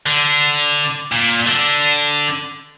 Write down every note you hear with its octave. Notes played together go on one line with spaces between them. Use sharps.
D3
A#2
D3